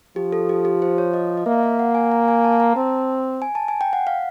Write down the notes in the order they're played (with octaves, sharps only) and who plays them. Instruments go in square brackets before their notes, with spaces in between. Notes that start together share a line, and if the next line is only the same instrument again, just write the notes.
[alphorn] F3 [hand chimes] G4
[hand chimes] A4
G4
G4
C5
C#5
D#5
D#5
[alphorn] A#3 [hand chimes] E5
[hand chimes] F5
F#5
G#5
A#5
G#5
A5
A#5
[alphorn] C4 [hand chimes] A5
[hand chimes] G#5
A5
G#5
G5
F#5
F5